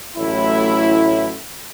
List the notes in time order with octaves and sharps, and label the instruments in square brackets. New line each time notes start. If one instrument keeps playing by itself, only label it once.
[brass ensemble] A1 A2 F#3 E4